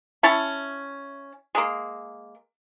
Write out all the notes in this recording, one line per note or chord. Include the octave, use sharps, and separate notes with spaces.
C#4 E4 C#5 A5
G#3 A#3